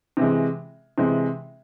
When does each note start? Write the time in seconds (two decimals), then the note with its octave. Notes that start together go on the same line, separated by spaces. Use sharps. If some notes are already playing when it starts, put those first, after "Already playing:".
0.17 C3 E3 G#3
0.98 C3 E3 G#3